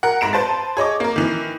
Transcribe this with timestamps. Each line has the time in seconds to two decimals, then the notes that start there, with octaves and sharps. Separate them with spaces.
0.03 A#4 F#5
0.21 G#2 A#5 D7 E7
0.33 B4 C5 A5 A6
0.77 G#4 C#5 D#5 D6
1.00 A#3 A#4
1.16 D#3 E3